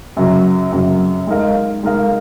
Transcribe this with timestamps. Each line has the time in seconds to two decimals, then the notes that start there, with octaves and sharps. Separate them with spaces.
0.17 F#2 C#3 F#3
0.72 F#2 C#3 F#3
1.27 G#3 D#4 A#4 F5
1.83 G#3 D#4 A#4 F5